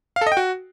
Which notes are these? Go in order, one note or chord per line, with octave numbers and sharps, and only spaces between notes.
F5
A4
D#5
G5
F#4